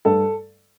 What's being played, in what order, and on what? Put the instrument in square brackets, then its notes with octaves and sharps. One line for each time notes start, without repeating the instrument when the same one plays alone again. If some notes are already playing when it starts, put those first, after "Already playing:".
[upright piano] G2 A4